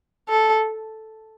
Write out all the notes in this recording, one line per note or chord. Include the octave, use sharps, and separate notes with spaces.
A4